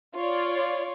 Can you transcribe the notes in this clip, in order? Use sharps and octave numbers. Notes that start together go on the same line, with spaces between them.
F4 C#5 D5